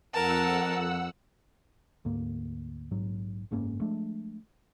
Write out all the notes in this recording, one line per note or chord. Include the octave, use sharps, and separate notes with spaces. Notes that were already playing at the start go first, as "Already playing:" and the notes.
F2 A#4 F#5 A5 E6
D2 G#2 A#3
A#1 G#2 F#3
F#1 G#2 A#3 C#4
F3 G#3 A3 D4